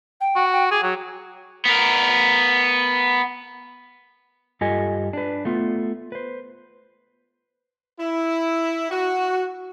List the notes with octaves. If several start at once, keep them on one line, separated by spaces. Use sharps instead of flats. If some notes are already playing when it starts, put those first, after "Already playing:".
G5
F#4
G5
G#4 D6
F#3 F#4
B3 A#4
G2 F4 G4 A4 D#5 G#5
D4 B4
A3 B3 F4
B4 C5
E4
F#4